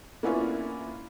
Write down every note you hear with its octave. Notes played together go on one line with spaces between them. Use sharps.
A#3 B3 C#4 D4 E4 F4